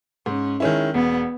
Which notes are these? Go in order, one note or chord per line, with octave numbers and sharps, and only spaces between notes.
G#2 C#4
D#3 G#3 C#4 E4
E1 B3